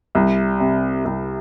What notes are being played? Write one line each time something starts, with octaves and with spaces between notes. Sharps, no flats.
C2
C3
C2